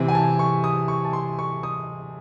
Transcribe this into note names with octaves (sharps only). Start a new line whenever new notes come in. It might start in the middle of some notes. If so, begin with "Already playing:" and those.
Already playing: C3 E3 C4
G#5
A5
C#6
D#6
C#6
A5
C6
C#6
D#6